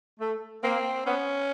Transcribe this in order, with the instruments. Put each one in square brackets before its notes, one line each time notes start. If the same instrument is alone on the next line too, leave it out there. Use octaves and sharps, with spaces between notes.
[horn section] A3
[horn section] A#3 [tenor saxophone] C4
[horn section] B3 [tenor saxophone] C#4